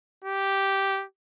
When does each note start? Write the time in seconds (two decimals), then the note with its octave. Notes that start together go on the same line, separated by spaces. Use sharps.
0.24 G4